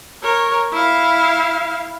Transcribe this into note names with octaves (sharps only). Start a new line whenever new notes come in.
A#4 C#5
E4 F5